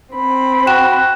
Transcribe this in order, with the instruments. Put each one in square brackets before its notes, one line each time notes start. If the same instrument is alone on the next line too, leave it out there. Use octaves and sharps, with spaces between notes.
[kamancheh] C4 B5
[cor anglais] F#4 [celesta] G5 E7